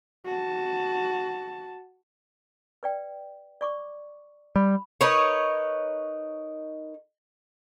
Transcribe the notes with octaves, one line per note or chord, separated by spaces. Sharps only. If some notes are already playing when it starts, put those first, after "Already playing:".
F#4 A5
B4 D5 G5
D5 C#6 D6
G3 B5
D#4 A#4 B4 C#5